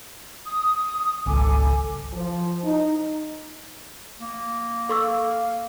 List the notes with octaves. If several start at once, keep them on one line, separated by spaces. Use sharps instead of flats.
D#6
G#1 C#2 A4 G#5 D6
F3
D#4
A#3
A4 F5 C#6 E6